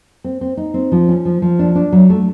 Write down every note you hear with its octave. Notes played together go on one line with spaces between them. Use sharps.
C4
C4
D#4
C4
F3
C#4
F3
F3
D4
D4
F#3
A3